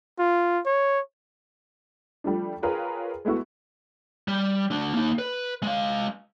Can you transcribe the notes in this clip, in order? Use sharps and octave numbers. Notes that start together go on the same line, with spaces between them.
F4
C#5
F3 G3 A3 D4
F4 G#4 A#4 B4 C#5 G5
G#3 A3 B3 E4 F#4
G3
A3 D4
A#3 D#4
B4
G#3 F5